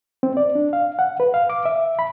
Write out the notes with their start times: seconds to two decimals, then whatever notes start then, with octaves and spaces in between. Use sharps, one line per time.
0.23 C4
0.37 D5
0.55 D4
0.73 F5
0.99 F#5
1.20 B4
1.34 F5
1.50 D6
1.65 E5
1.99 B5